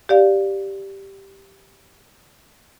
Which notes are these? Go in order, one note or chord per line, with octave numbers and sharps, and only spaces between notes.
G4 D5 F5